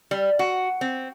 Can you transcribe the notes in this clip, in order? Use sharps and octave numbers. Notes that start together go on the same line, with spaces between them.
G3
F#4
C4